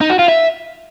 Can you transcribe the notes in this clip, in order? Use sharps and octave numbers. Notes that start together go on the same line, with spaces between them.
D#4
F#4
F4
E5